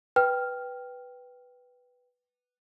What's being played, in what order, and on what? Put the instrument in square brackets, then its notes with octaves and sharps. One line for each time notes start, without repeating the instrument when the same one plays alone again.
[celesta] B4 G5 F6